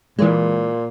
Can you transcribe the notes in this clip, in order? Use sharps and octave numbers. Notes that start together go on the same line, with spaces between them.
A#2 E3 G#3